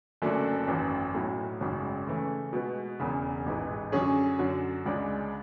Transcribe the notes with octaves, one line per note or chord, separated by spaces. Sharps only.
F#1 F#2 D3 A3 D4
G#1 F#2 E3
B1 A2 F#3
G#1 F#2 C#3 G#3 C#4
C#3 E3 A3
B2 G#3 B3
E1 E2 C#3
A1 G#2 E3
F#2 D3 F#3 C#4 G#4
F#2 D3 F#3
C#2 C#3 G#3 D4